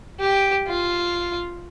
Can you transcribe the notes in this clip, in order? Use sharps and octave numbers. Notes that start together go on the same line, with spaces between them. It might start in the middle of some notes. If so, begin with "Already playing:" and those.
G4
F4